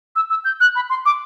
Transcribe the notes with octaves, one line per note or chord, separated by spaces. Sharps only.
E6
E6
G6
F#6
B5
C6
D6